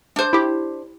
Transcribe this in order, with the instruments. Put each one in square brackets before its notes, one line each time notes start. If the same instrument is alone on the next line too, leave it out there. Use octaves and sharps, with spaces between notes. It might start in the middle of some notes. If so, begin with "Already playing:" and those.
[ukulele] D4 C5
[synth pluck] E4 G4